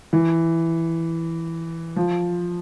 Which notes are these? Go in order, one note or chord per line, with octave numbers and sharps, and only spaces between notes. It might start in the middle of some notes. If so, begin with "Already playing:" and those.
E3
F3